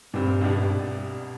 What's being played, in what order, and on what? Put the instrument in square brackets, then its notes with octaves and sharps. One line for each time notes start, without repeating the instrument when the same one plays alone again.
[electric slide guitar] G2 [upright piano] A#2 G3 C4
[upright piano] C2 B2 G3 B3 D4